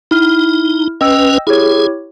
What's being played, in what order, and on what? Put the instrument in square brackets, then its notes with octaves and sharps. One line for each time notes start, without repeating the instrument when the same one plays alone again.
[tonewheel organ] D#4 [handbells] E4 F6
[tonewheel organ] C#4 B4 [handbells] D#5 G5 E6
[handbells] E4 G4 C#5 [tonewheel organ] G#4